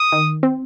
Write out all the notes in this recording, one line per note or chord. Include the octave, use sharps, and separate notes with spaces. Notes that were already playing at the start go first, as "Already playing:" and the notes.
Already playing: D#6
D#3
C4